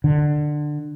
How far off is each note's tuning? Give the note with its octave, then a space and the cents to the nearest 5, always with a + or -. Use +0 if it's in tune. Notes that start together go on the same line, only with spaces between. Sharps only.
D3 +20